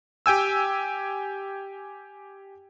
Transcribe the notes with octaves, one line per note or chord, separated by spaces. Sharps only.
G4 G5 G#5 E6